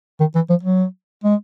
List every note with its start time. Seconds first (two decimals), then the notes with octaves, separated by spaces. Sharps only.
0.20 D#3
0.35 E3
0.50 F3
0.63 F#3
1.24 G#3